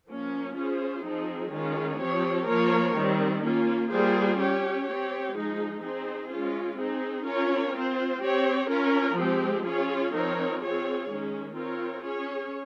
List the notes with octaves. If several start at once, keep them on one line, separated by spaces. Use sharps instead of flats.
F3 A#3 C#4
C#4 F4 G#4 C5
F3 C4 D#4 G#4
D#3 G#3 C#4 F4
F3 C4 G4 C#5
F3 A#3 F4 A#4 C#5
D#3 G3 C4
A#3 C#4 F4
G3 A#3 F4 G#4 C5
C#4 G4 C#5
C4 G4 C#5
F3 G#3 D#4 G#4
C4 D#4 G#4 C5
G#3 C#4 F4
C4 D#4 G#4
C#4 F4 A#4 C#5
C4 F4 C5
C4 G4 C#5
C#4 F4 A#4
F3 G#3 C4 G4
C#4 F4 G#4 C#5
F3 C4 D#4 A#4 C#5
C4 F4 G#4 C#5
D#3 G#3 C#4
C4 F4 A#4 C#5
C#4 G#4 C#5